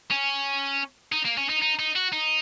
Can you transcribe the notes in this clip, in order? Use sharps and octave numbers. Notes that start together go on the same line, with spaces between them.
C#4
D#4
A#3
C#4
D#4
D#4
D#4
F#4
D#4